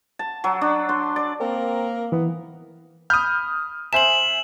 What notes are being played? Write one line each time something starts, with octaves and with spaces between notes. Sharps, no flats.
A5
F#3
D4
C6
D5
A#3 C4 A#4
E3 B3
B5 D#6 F6 G6
C5 E5 G#5 E7 F#7